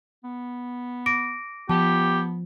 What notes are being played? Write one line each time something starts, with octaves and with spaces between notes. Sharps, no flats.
B3
D6 A#6 D7
F3 B3 G4 A5